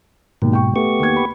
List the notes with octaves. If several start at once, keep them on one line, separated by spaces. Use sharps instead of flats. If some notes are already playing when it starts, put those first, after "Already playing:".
D#2 G#2 B2
G5 C#6
A3 B3 G4 C#6
D#2 G#6
B5